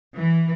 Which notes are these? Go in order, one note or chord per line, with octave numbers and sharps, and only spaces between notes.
E3